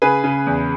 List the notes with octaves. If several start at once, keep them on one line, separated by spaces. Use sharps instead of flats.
C#3 G#4 B4
C#3
E2